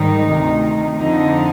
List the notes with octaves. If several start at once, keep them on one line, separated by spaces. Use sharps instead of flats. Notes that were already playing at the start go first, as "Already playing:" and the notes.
Already playing: G#2 D#3 G3 D#4
D2 C3 D#3
F2 D3 F3 D#4